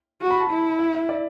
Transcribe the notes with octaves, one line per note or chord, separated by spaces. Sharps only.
F#4
B5
A5
E4
E5
E5
D5